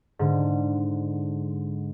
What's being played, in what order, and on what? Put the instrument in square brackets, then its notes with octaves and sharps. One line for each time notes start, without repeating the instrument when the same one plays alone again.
[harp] G#2 D3